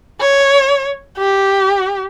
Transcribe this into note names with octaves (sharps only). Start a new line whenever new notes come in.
C#5
G4